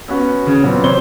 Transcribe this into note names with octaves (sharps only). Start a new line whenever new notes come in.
B3 C#4 F#4
C#3
A#2 F#3 B3 C4
C3 C5 C#5 G7